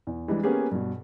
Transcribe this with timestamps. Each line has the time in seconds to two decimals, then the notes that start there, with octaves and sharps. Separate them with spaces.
0.07 E2
0.28 E3 G3 G#3 D4
0.43 A#3 B3 C#4 G4 G#4
0.71 G2 B2